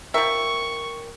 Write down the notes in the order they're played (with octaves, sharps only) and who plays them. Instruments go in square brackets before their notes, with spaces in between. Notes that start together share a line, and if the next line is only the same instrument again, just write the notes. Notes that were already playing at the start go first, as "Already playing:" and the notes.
[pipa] F3 E5 [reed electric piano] A#4 G5 [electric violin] C#6